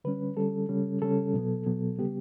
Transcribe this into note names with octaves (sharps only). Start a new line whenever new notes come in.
D3 G3 C#4 B4
D3 G3 C#4 A4
C#3 G3 C#4
C#3 G3 C#4 A4
B2 F#3 B3
B2 F#3 B3
C#3 G3 B3 G4